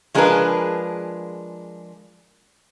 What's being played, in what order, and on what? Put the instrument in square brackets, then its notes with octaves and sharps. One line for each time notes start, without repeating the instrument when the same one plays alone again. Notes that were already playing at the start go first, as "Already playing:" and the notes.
[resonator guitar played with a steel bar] F3 G#3 D4 G#4 A#4 B4